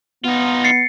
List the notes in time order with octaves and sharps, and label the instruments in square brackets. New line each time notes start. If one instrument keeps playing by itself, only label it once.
[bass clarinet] B3 [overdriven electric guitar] D#4 F4
[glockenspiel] A6 C7 C#7